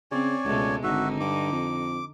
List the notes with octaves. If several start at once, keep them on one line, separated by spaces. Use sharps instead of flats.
C#3 C4 C#5 D5 G#5
C#2 B2 G#3 A3
G#1 D3 D#4 F#4 E5
G2 D6
F2